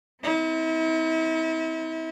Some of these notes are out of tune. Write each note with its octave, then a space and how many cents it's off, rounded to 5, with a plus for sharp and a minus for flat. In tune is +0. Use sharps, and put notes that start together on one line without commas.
C4 -20 E4 -40